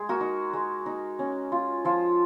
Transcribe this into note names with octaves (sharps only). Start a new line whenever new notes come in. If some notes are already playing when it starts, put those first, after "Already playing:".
Already playing: G#3 G#4
F#4 A#4
D#4
G#3
D#4
C#4
F4
F3 F4